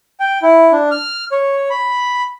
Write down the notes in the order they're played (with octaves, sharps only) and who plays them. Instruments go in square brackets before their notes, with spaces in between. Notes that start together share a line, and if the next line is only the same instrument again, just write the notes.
[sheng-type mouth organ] G5
E4
D4
F6
C#5
B5